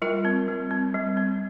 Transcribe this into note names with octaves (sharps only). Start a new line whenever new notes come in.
G3 F4 A#4
C4
G3
C4
G3
C4